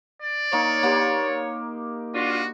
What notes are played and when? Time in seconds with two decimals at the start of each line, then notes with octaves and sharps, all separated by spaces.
0.22 D5
0.53 A#3 D#4 C#5
0.83 A#3 G4 C6
2.15 D4 F4 F#4